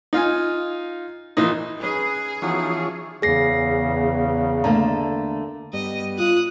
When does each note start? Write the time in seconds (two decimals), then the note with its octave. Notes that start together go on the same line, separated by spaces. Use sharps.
0.13 D#4 F4 F5 G#5
1.37 A#1 E3 D#4 D#5
1.82 C#4 D#4 G#4 B4
2.42 E3 F3 B3 C#4 D#4 F#4 C#5
3.22 E2 C#3 G#4 A#6 C7
4.64 D3 A3 A#3 A#5
5.73 G2 G3 B3 D#5
6.19 F4 D#6 F#6